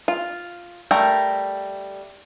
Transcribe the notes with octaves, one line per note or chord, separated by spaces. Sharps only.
F4
G3 A3 A#4